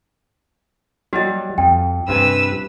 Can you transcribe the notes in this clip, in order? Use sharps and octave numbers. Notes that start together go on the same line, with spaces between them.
F#3 G3 F#4 D#5
F2 G5
G2 C3 B4 G#5 E6